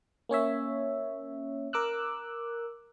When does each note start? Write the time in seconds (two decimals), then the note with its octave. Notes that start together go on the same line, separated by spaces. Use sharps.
0.29 A#3 C#4 C#5 E5
1.73 A#4 D6 E6 F#6